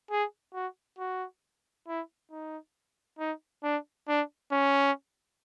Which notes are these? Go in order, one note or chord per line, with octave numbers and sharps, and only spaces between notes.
G#4
F#4
F#4
E4
D#4
D#4
D4
D4
C#4